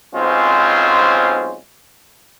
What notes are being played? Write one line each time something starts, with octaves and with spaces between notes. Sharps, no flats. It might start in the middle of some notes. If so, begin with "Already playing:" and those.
B1 G#3 C4 C#4 F4 C5